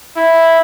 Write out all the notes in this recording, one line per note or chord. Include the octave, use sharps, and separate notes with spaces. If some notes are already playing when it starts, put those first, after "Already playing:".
E4